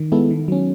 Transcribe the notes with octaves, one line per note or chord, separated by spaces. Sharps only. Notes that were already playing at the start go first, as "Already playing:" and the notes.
Already playing: D#3
G#3 B3 E4 A4
D#3
F#3 C#4